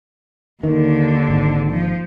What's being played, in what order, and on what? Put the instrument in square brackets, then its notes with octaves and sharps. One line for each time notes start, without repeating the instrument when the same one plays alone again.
[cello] D#2 D3 [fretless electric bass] D#3
[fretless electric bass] G#1 G#2
[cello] F3